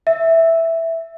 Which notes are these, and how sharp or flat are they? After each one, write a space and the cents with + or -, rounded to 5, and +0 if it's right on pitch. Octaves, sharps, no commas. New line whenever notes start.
E5 +0